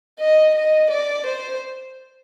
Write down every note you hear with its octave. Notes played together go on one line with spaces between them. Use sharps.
D#5
D#5
D5
C5